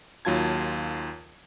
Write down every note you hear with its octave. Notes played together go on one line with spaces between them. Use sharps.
D#2 F#3 F4 A5 G#6